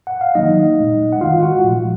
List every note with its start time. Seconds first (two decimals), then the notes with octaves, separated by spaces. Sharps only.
0.07 F#5
0.21 F5
0.35 D#3 F#3 A#3 D#4 D#5
0.78 A#2 G#3
1.13 F#5
1.21 D#3 G#3 F4 F5
1.43 F#4 F#5
1.64 A#2 F3 G#3